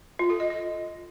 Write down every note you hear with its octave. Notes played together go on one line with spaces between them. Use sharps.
F4
A4
D#5
D#5